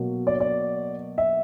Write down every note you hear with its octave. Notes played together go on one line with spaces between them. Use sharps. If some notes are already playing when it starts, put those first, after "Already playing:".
Already playing: B2 F#3 A#3
D5
C#5
D5
E5